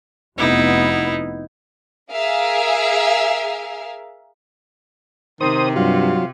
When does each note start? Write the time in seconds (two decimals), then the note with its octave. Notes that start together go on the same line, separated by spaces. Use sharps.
0.38 F1 B3 D#4 E4
2.12 G#4 A#4 E5 F5
5.41 C3 D#3 C5 D#6
5.76 G2 F#3 F4